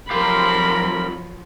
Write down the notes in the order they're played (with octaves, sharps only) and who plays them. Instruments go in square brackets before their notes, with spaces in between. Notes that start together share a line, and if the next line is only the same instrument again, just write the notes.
[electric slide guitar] F2 G4 F5 [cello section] F3 F#3 [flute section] A#4 C6 [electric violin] B5